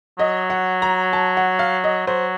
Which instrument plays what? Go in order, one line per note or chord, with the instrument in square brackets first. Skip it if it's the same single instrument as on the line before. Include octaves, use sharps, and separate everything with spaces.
[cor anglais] F#3 [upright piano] D#5
[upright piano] F#5
A#5
A5
F#5
F5
D#5
[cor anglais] F#3 [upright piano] C5